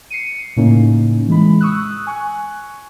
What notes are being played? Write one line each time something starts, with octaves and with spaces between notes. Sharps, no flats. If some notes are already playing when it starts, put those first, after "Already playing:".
C7 C#7 D#7
A2 C#3 A#3 C#4 D#4
E3 G#3 B5
C#6 D#6 E6 F#6
G#5 C#6 F#6